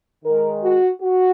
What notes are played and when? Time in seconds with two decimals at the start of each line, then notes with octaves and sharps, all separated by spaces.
0.25 D#3 G#3 A#4
0.62 F#4
1.01 F#4